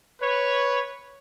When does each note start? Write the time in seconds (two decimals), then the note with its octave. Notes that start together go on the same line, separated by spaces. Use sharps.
0.21 B4 C#5